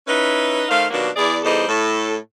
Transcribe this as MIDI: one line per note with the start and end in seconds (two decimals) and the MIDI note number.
0.07 0.63 61
0.07 0.63 63
0.07 0.63 64
0.07 0.63 71
0.69 0.86 51
0.69 0.86 57
0.69 0.86 72
0.69 0.86 77
0.91 1.08 39
0.91 1.08 47
0.91 1.08 54
0.91 1.08 58
0.91 1.08 62
1.16 1.38 40
1.16 1.38 64
1.16 1.38 68
1.16 1.38 74
1.44 1.64 40
1.44 1.64 55
1.44 1.64 63
1.44 1.64 69
1.44 1.64 72
1.44 1.64 75
1.68 2.17 45
1.68 2.17 69